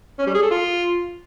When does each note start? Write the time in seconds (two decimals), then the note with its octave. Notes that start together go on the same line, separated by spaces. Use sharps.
0.19 C#4
0.27 G3
0.35 G#4
0.43 A4
0.51 F4